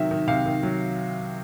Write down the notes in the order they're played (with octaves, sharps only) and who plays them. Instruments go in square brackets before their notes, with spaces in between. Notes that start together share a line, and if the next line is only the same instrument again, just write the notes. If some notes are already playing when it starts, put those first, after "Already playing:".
Already playing: [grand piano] C3 D#3 F#3 E5
D#3
C3 F5
D#3
F#3